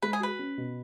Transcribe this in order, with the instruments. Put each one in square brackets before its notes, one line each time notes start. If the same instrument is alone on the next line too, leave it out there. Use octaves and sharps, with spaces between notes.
[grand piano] G#3 [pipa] B4
[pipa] G#4
[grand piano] F#4 [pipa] B4
[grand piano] C#4
B2